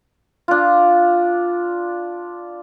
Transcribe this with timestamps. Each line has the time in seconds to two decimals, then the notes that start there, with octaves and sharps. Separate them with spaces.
0.48 D4 F4